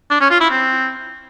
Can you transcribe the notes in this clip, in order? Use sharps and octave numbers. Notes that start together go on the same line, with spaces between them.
D4
C#4
F4
E4
C4